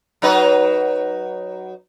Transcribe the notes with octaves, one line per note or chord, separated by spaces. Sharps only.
F#3 D#4 B4